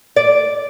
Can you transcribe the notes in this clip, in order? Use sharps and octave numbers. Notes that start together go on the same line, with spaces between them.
D5